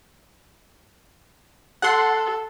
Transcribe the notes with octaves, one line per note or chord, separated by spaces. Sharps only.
A4 F#5 C6